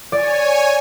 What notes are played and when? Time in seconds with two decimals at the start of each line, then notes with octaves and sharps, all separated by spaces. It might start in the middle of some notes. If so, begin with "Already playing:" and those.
0.12 C#5 D5 G#5